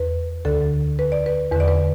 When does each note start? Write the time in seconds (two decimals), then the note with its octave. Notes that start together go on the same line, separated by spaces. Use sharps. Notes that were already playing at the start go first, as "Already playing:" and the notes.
Already playing: E2 B4
0.45 D2 D3 A4
0.99 B4
1.12 D5
1.26 B4
1.51 E2 B4
1.56 D3 D5
1.68 B4